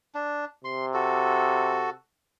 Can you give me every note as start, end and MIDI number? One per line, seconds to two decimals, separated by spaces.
0.15 0.45 62
0.64 1.94 48
0.64 0.86 84
0.94 1.90 66
0.94 1.90 69